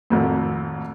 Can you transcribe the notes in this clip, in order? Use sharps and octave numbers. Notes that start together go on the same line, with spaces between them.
G#1 F2 A2